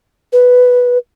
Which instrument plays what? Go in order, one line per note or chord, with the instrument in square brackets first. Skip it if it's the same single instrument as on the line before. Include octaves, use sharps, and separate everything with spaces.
[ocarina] B4